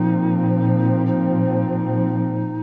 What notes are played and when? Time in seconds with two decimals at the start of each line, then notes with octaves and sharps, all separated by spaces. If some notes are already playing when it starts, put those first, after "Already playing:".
Already playing: A#2 F3 C4 D#4
1.06 D#4